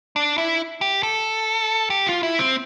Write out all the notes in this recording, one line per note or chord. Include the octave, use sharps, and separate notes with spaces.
D4
E4
G4
A4
G4
F4
E4
C4